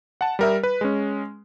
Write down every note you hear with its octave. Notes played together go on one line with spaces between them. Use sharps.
F#5 A5
G3 A#4 E5
B4
G#3 C#4